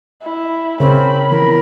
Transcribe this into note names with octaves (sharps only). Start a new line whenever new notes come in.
E4
C#3 C4 C#4 A#4 C#5 B5
E3 F3 B3 A#4